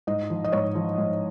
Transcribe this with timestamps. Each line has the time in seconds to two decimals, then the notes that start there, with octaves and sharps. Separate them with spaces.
0.07 G#2 D#5
0.30 F3
0.44 D#5
0.52 G#2 C#5
0.75 F3
0.98 G#2